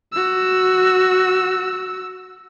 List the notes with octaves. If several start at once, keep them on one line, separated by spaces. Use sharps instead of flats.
F#4 E6